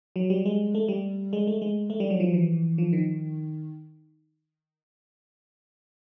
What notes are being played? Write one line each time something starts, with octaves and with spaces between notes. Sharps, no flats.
F#3
G3
G#3
A3
G3
G#3
A3
G#3
A3
G3
F#3
F3
E3
F3
D#3